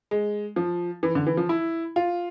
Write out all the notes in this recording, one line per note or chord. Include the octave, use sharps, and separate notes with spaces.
G#3
F3
E3
D3
E3
F3
E4
F4